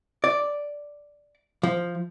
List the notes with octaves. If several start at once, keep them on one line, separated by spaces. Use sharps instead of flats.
D5
F3